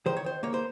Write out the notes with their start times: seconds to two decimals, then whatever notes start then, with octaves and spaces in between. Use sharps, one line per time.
0.06 D#3 C5
0.17 C#5
0.24 D#3 C5
0.43 A#3 C#5
0.54 C5